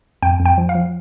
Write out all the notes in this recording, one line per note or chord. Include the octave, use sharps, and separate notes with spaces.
F2 G5
F2
G5
F3
F5
F3